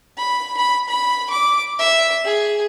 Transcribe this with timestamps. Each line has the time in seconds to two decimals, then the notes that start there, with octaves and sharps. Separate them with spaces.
0.17 B5
0.57 B5
0.88 B5
1.30 D6
1.79 E5
2.24 G#4